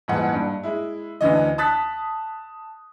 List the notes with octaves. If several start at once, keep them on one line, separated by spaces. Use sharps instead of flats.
D#1 G#2 E3 F#5
G2
G#3 E4
D2 D3 E3 D#5
A5 D#6 F#6 A6 B6